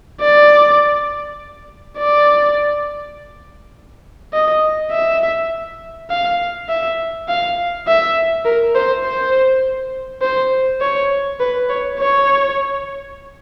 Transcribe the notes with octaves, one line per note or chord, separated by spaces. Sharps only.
D5
D5
D#5
E5
F5
E5
F5
E5
A#4
C5
C5
C5
C#5
B4
C#5
C#5